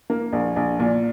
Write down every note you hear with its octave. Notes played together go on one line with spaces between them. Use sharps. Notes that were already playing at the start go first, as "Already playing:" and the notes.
A#3
A#1
A#1
A#2